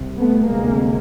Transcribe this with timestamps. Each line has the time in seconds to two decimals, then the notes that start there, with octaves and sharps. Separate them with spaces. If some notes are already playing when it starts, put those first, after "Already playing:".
Already playing: C2 C3
0.17 A3 B3
0.47 D2 C3 G#3 A#3